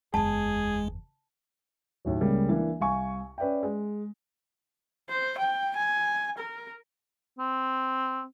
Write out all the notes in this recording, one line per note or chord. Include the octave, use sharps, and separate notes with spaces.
F#1 E2 G#3 G#4 A5
D#2 A2 F#3
C#2 C#3 G3 G#3 A#3
E3 A#3 D4
C2 F5 G#5 C#6
C#4 B4 D5 E5 G5
G#3
C5
G5
G#5
A#4
C4